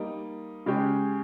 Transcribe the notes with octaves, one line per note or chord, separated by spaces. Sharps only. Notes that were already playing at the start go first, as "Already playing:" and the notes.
Already playing: G3 A#3 D#4
C#3 G#3 C#4 G4